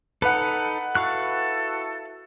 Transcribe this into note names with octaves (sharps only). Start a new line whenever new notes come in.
D#4 A4 B4 F#5
E4 F#4 A4 F5 C#6 F#6